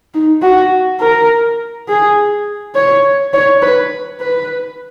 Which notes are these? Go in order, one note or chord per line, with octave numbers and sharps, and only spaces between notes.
D#4
F#4
A#4
G#4
C#5
C#5
B4
B4